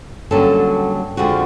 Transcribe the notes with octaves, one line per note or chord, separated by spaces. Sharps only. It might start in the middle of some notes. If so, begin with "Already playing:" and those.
G2 D3 F#3 A#3 C#4 A4
F2 D3 F3 G#3 F#4